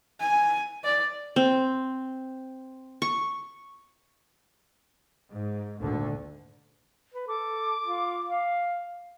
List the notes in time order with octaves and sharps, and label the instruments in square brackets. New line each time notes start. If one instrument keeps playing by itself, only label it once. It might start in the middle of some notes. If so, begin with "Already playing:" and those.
[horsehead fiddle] G#5
D5
[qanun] C4
C#6
[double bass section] G#2
G#1 D2 A#2 D3
[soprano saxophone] B4
[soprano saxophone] A4 [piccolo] D6
[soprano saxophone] F4
F5